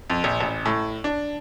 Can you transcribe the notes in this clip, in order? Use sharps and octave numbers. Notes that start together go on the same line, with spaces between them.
F2
A#1
A1
A2
D4